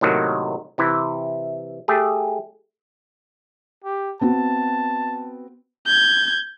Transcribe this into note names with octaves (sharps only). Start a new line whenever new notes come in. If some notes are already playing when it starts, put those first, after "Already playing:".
A2 C3 D#3 F#3 A#3
C3 E3 E4
A3 G4 G#4
G4
B3 C4 F#4 A5
G6 G#6